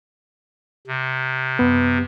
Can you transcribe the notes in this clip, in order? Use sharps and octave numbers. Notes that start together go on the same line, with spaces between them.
C3
F#2 B3